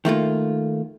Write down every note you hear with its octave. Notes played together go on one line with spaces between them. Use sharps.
D#3 A3 A#3 F4